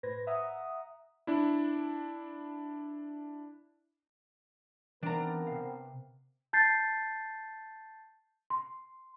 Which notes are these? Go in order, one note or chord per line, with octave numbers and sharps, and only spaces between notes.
A2 B4 C5 G#6 A#6
E5 F#5 A#5 D#6
D4 E4
D#3 E3 B3 C4 D4 A#4 A#5
C3 F5
A5 G6 A6 C7
C6